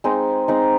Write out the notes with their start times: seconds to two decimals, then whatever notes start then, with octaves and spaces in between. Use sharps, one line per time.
0.04 G#3 C4 D#4
0.48 G#3 C4 D#4